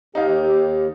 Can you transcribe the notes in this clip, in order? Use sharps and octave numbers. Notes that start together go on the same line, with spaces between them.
D#2 D#4 G4 F5